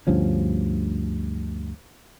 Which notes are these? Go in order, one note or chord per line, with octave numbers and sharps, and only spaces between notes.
D2 G2 F3 C#4